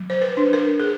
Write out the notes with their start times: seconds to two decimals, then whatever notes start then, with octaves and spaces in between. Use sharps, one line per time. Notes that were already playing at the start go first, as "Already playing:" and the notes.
Already playing: F#3
0.10 C5
0.21 B4
0.37 D4
0.53 A#4
0.80 G#4